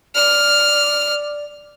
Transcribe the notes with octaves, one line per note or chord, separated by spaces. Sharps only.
D5 F6